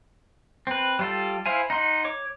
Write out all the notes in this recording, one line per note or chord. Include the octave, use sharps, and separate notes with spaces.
C4 B4
G3 F4 A4
E4 C5 F5 G#5
D#4 F#5 C6
C#5 D6